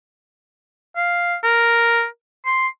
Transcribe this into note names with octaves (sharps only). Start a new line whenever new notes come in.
F5
A#4
C6